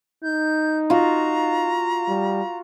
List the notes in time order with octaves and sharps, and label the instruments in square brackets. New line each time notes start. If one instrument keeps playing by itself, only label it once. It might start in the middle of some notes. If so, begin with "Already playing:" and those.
[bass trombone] D#4 [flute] G6
[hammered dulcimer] F4 F#4 [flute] A#5
[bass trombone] G3